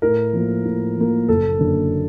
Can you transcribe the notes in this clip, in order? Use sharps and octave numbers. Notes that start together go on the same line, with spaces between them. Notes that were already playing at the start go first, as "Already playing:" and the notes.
A2 A#4
F3 A#3
A2
F3 A#3
F#1 A4
F#2 D3